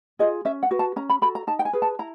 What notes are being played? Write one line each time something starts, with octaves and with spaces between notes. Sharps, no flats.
F4 G#4 D#5
C#4 E5
F#5
F#4 B4
A5
C#4 A#5
B5
F#4 A4 B5
A#5
D#4 A5
G5
G#5
G#4 B4
A5
E4 A#5